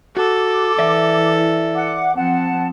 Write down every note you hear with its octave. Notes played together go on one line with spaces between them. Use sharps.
F#4 A4 D6
E3 E4 D5 E5
F#5 D6
F3 C4 F#5 A5